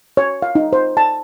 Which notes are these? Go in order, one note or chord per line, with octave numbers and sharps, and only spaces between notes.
C#5
F5
D#4
C5
A5